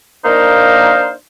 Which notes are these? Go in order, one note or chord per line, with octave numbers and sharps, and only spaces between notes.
A#3 D4 D#4 A#4 C5 F5